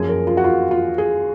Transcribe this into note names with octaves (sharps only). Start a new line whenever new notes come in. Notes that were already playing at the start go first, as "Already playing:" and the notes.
Already playing: F#2 F3 A#3 C#4 G#4
A#4
F4
F#4
F4
F4
G#4